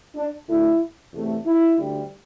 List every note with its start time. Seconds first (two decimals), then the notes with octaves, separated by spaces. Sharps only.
0.15 D4
0.47 D2 D3 A3 E4
1.13 E2 C3 A3
1.44 E4
1.77 D2 D3 G3